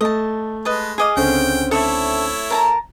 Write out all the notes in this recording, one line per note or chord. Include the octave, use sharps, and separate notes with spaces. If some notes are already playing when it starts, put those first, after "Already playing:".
A3 D#5 A5
G#3 B4 D#5 A5
G#4 D#5 F5 G#5 D6
C#2 D3 C4 C#4 G5
A3 E4 A4 C#5 D5 E5
A#4 A5 A#5